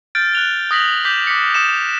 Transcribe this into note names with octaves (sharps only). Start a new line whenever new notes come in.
F6 G6 A6 D7
F#6 A6 F7 G7
D#6 A#6 B6 F#7
D6 G6 B6 F7 F#7
D6 B6 C#7
D#6 C#7 E7